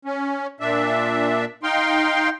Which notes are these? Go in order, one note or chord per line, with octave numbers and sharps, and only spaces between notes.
C#4
A#2 D4 E5
D#4 F5 G5 C6